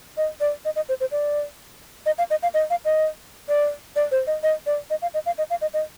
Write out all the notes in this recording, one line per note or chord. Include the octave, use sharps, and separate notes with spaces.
D#5
D5
D#5
D#5
C5
C5
D5
D#5
F5
D#5
F5
D#5
F5
D#5
D5
D5
C5
D#5
D#5
D5
D#5
F5
D#5
F5
D#5
F5
D#5
D#5